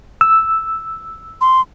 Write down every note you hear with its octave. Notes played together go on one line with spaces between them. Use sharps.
E6
C6